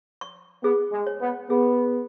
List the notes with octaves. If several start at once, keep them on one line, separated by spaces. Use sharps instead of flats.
C#6
B3 G#4
G#3
C#5
B3
B3 G#4